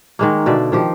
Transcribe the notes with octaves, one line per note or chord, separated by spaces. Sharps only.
D#3 G#3 A#3
B2 D3 D5 E5
D#3 F3 G4